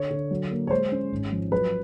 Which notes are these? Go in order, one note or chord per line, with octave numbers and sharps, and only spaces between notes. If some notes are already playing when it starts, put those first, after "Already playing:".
Already playing: D3 C#5
D3
F#3
A#3
C#5
G#3 C5
C#4
G#1
F3
F#3 B4